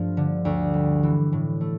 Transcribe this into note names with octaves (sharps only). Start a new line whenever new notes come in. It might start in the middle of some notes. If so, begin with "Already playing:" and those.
Already playing: G2 F3 A3
D3
D2
G3
E3
A2
A3